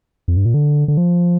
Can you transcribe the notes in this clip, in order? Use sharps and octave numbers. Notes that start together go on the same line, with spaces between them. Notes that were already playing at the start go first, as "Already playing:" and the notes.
F2
G2
A#2
D3
D3
F3